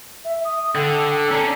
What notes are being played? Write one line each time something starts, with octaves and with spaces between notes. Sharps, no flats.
E5
D#6
D3 A4 G5
C#4 D4 A#5